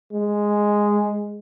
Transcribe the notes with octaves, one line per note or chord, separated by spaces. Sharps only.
G#3